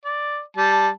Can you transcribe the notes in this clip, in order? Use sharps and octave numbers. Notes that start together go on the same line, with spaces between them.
D5
G3 A5